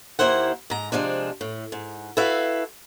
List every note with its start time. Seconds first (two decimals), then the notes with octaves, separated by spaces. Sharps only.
0.19 D#2 A#3 E4 C5 F#5
0.70 G#2 A#5
0.92 C3 F3 G#3 D4
1.41 A2
1.72 G#2
2.17 E4 F#4 A4 B4 F5